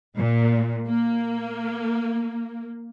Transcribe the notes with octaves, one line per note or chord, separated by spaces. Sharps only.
A#2
A#3